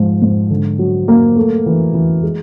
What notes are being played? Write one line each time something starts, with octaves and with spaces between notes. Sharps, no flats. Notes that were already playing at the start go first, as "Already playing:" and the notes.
Already playing: G#2 F3
G#2
D3
F#3
A#3
A3
E3
E3
G#3